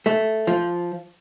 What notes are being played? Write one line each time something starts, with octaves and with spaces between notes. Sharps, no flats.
A3
F3